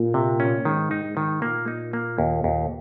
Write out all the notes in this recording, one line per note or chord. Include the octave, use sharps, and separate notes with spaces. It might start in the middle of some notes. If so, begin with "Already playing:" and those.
Already playing: A#2
C3
C#4
G#2 D#3
D#4
G#2
D#3
A#2 A#3
D#4
A#3
D#2
D#2